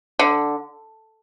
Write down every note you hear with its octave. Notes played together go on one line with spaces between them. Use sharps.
D3